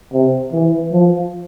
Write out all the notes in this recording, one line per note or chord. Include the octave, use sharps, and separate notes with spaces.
C3
E3
F3